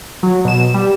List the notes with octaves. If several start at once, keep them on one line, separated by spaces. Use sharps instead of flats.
F#3
B2 E7
G3